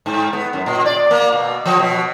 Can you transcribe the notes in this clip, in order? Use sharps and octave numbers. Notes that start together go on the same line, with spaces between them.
G#2
B3
F#2
A#2
D5
A#3
B2
F3
B2